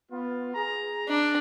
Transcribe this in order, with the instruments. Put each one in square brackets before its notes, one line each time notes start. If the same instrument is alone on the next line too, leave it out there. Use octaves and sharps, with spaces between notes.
[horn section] B3 F4
G#4 A#5
[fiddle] D4